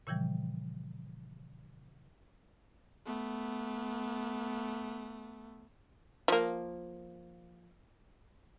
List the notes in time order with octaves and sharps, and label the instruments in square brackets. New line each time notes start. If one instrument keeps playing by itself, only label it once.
[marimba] A#2 C#3 E3 F3 G3
[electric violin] A3 B3
[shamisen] F3 A#3